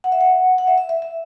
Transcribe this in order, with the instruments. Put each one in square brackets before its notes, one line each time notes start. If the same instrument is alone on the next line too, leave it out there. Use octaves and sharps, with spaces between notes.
[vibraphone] F#5
E5
F#5
F#5
E5
E5
E5
E5